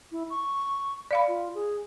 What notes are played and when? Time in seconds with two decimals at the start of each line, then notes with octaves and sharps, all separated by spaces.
0.12 E4
0.30 C#6
1.11 D5 F5 B5
1.28 F4
1.55 G#4